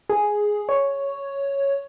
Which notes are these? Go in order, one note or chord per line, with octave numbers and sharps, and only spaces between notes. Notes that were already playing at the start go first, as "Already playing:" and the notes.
G#4
C#5